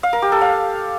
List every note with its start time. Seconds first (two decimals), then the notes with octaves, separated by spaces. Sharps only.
0.03 F5
0.13 A#4
0.22 G4
0.32 A4
0.41 F5